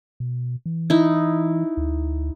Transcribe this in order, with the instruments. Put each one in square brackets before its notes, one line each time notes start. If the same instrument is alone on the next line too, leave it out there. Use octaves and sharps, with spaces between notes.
[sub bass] B2
E3
[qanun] D#4 E4
[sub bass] D2